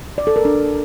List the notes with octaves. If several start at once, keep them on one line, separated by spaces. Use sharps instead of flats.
D5
A4
A#4
D4